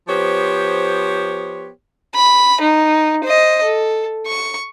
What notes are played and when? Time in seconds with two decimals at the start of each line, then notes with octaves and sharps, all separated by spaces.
0.08 F3 B3 G4 C5 C#5
2.15 B5
2.60 D#4
3.24 C5 D#5
3.63 A4
4.27 C#6